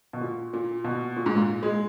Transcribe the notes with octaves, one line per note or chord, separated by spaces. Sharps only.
B2
A#2
A#2
B2
A#2
G#2
A#2
G#3